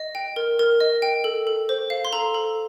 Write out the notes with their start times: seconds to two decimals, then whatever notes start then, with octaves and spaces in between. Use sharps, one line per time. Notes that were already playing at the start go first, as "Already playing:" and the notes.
Already playing: D#5
0.15 G5
0.36 A#4
0.59 A#4
0.80 D#5
1.02 G5
1.24 A4
1.47 A4
1.69 C5
1.90 F5
2.05 C6
2.13 A4 A#5
2.34 A4